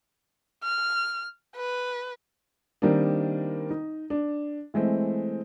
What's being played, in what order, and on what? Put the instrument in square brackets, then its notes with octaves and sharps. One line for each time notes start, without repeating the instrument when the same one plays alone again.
[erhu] F6
B4
[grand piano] D#3 G3 A#3 C4 D4
D#4
D4
E3 G#3 A3 C4